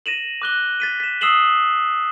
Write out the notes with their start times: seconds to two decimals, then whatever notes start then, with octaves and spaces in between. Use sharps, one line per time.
0.06 A#6 D#7 E7 F#7
0.42 D6 F#6 G7
0.80 A6 B6 D#7
1.00 B6 E7
1.21 D#6 E6 C7 E7 F#7 G7